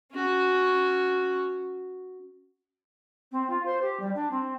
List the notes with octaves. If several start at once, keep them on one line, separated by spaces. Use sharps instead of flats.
C#4 F#4
C4
F4
C5
G4
G3
D4
C4